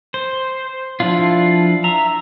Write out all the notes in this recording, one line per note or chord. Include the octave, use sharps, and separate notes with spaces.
C5
F3 D4 E4 F4
E5 A#5